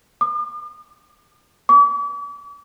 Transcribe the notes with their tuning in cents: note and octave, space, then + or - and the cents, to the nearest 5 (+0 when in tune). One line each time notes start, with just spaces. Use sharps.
D6 +45
D6 -40